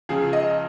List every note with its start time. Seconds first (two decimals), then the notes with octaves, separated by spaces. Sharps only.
0.09 C#2 C#3 F3 G#4
0.33 D#5